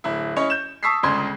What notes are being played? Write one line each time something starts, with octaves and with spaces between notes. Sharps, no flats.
D1 E4
C#4 E4 C#5 D#5
G6 E7
A5 C#6 D#6 E6 B6 C7
G1 C#2 C#3 C6 G#6